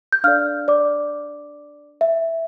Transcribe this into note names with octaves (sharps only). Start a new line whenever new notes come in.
G6
D4 A4 D5 F5 F6
D5 D6
E5